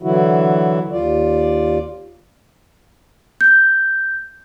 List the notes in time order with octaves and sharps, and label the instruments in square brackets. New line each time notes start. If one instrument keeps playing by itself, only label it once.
[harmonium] D3 E3 F#3 E4 F#4
D#2 F4 D5
[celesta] G6